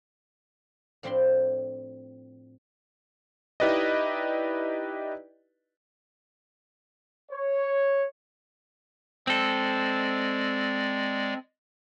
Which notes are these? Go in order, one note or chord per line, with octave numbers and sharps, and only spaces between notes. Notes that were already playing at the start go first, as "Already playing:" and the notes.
A2 F3 C4 D4 B5 C6
D#4 E4 G4 B4 D5 D#5
C#5
G#3 C4 A4 D5